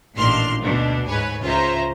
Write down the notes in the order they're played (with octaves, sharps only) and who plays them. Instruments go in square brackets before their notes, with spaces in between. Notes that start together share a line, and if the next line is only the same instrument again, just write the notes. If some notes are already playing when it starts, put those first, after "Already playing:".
[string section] A1 A#2 D#3 D4 C6 F6
D2 B2 D4
G#2 B4 C#5 G#5
C#2 F4 C5 C#5 E5 A#5